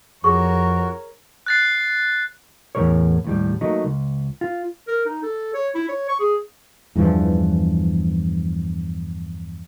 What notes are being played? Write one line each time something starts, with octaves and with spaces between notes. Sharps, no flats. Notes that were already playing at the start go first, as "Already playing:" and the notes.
F2 F#4 G#4 A#4 C#5 C#6
F#6 A6 C7
E2 A2 C3 A#4 C#5
D#2 A2 G3
F#3 A3 A#3 D#4
C#2
F4
A#4
D#4
A4
C#5
E4
C#5
C#6
G#4
E2 G2 E3 F3